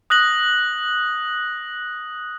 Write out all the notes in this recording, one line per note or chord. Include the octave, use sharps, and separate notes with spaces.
D#6 F#6 A#6 F#7